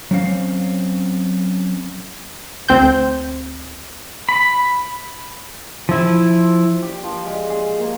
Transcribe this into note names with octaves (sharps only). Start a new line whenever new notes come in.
F#3 C4 C#4 F5
D2 C4 C5 G6
B5
F3 E4
G4
F3
G#3
G#4
A#3